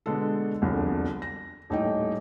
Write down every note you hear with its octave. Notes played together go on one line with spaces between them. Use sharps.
B2 D3 G#3 D4 A4
E1 C2 F2 D3
A#6
D#1 A2 D#4 D#5 G5